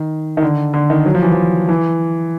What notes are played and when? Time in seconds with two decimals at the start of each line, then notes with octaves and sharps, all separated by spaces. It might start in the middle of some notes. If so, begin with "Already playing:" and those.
Already playing: D#3
0.37 D#3
0.42 D3
0.74 D3
0.90 D#3
1.06 F#3
1.15 F3
1.22 E3
1.32 F3
1.69 E3